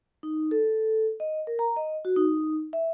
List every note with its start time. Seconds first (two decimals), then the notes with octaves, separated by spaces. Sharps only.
0.23 D#4
0.51 A4
1.20 D#5
1.47 A#4
1.59 A#5
1.76 D#5
2.05 F#4
2.16 D#4
2.73 E5